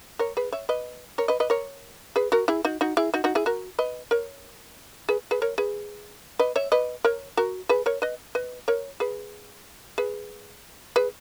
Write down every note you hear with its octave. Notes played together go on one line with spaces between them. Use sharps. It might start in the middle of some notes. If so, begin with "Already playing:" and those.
A#4 C#5
G#4 B4
C#5 E5
B4 D#5
A#4 C#5
B4 D#5
B4 D#5
A#4 C#5
G#4 B4
F#4 A#4
E4 G#4
D#4 F#4
D#4 F#4
E4 G#4
D#4 F#4
D#4 F#4
E4 G#4
F#4 A#4
B4 D#5
A#4 C#5
G#4 B4
G#4 B4
A#4 C#5
G#4 B4
B4 D#5
C#5 E5
B4 D#5
A#4 C#5
F#4 A#4
G#4 B4
A#4 C#5
B4 D#5
B4 D#5
A#4 C#5
G#4 B4
G#4 B4
G#4 B4